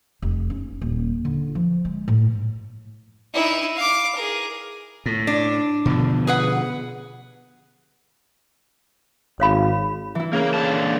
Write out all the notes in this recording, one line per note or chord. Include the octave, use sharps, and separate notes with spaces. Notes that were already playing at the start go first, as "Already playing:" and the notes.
F1
C#4
D#1
D3
F3
G#3
A2
D#4 E4
F5 D6
G#4 A#4
A2
D4
B2 D3 F3
G#4 B4 F#5
G#1 C#5 F5 B5
E3 E4
C#3 A#3 A#4
A#2 D3 A5